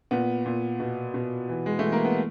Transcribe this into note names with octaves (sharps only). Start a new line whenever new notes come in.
A#2 B3
A#2
B2
B2
E3
G#3
E3 A3
A#3
B3